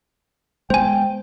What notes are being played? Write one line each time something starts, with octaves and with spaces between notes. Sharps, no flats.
G#3 B3 C5 G5 G#5